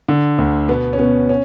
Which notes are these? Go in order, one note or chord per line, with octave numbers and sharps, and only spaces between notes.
D3
D2
B2 B3
C#4
B2 B3
C#4